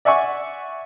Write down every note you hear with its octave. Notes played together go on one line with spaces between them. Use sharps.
D5 E5 F#5 G#5 C#6